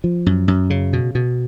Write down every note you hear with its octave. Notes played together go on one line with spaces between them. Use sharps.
F3
F#2
F#2
C#3
B2
B2